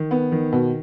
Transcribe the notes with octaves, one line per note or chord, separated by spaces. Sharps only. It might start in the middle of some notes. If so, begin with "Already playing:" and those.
Already playing: D#3
B3
D#3
B2